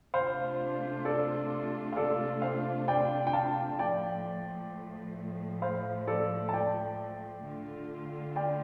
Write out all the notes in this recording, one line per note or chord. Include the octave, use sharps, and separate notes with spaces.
C3 A3 D4 F4 C5 F5
A4 D5
F5
A4 D5
C5 F5
D5 G5
G5
F5 A5
A2 F3 A3 D5 G5
C5 F5
A4 D5
A5
D5 G5
D3 A3 F4
D5 G5